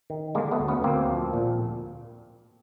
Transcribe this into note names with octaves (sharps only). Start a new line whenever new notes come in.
D#3
D3 G#3 A#3
A3 B3
D2
B3 C#4
D2 A#3 C4
F3
A#2